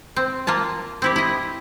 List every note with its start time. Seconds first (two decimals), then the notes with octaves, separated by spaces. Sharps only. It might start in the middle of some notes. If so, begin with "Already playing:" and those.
0.16 C4
0.47 A#3 F4 A5
1.02 C4 E4 G4
1.16 E4 D#5